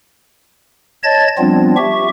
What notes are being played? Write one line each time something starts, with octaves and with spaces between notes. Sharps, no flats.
C#5 D#5 A5 G#6 A6
F3 G3 B3 C4 D4 F4
G4 E5 C#6